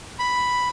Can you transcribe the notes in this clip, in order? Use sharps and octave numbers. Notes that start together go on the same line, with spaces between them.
B5